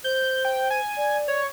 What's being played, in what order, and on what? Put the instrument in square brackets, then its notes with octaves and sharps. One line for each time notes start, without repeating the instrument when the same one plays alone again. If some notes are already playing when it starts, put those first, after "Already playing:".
[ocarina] C5 [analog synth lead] G6
[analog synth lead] G5
G#5
[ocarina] D5
[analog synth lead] C#5